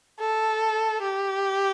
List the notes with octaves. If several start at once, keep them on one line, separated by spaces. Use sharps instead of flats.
A4
G4